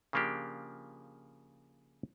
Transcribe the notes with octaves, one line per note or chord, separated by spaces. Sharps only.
C#3 F3 A#3 D4 G4